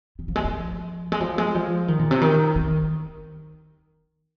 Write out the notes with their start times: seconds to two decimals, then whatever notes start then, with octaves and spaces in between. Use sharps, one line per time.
0.19 D#3
0.28 F3
0.36 G#3
0.45 F3
1.12 G#3
1.20 F3
1.38 G#3
1.55 F3
1.88 D#3
1.99 A#2
2.11 C3
2.21 D#3
2.56 D#3